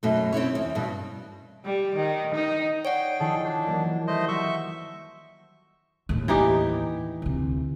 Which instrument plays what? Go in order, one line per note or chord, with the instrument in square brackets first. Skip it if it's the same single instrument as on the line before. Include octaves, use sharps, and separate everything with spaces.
[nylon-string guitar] F#2 B2 A3
C4 C#4 E4 C#5
E2
G2 B2
[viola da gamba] G3
D#3
D#4
[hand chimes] C#5 D5 F#5 [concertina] G5
[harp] D#3 F3 E4 [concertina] G#4 A4
[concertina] D4 [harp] G#5 G6
[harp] E3 F#3 A#3
[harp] G3 [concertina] A3 C5 D#5
[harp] F#3 [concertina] E5 C#6
[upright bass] D#2 A2
[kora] E3 D#4 G4
[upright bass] D2 C3